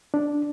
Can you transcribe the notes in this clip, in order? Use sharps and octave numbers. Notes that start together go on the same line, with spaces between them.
D4